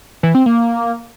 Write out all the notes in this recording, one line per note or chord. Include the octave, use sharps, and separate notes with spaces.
E3
C4
A#3